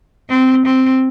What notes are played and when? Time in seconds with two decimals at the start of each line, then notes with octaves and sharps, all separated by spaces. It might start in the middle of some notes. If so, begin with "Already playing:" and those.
0.29 C4
0.66 C4